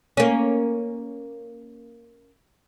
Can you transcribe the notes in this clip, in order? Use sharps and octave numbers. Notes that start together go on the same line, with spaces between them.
A#3 C#4